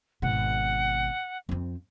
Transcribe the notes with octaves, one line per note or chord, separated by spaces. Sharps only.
G#1 B2 F#5
F2 C4